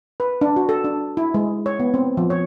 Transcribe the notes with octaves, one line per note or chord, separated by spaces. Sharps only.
B4
D4
F#4
A4
D4
E4
G#3
C#5
B3
C4
F3
C#5